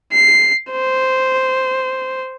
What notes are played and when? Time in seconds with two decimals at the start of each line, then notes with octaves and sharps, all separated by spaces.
0.12 C7
0.72 C5